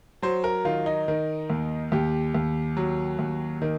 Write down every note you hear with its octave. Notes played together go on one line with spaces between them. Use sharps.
F#3 C5
A#4
D#3 F4
D#4
D#3
D#2
D#2 G4
D#2
F#3
D#2
D#3